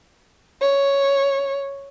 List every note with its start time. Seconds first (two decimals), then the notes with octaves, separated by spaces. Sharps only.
0.61 C#5